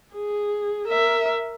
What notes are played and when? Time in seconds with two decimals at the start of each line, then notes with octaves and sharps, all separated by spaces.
0.14 G#4
0.87 A#4 E5